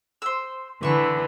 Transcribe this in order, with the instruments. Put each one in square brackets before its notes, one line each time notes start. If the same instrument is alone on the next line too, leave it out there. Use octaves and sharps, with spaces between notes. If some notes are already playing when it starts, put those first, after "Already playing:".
[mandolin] C5 E6
[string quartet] D3 [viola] E3 [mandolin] E5 C#6